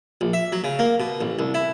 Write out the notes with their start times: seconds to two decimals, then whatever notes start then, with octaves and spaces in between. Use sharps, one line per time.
0.21 A#1
0.33 E5
0.52 F#3
0.64 C#3
0.79 A#3
1.00 B2
1.21 A1
1.39 C2
1.54 E4